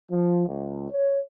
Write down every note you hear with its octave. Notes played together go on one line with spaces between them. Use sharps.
F3
C#2
C#5